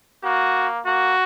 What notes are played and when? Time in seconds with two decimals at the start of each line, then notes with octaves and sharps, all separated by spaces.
0.24 A#3 F#4
0.86 A#3 F#4